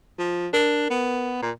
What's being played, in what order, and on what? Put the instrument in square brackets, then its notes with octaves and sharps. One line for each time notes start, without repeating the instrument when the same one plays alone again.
[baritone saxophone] F3
[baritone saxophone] D4 [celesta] A#4
[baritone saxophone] B3
A#2